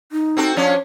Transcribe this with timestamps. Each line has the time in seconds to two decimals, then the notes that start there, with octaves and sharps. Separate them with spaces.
0.12 D#4
0.37 C4 F#4 A4
0.56 F3 C#4 D4 C#5